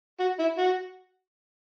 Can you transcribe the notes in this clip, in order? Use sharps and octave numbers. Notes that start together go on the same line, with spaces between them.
F#4
E4
F#4